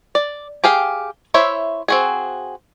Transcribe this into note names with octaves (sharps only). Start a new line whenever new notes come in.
D5
G4 G#4 F5 G5
E4 C5 C#5 E5
C4 F#4 G#4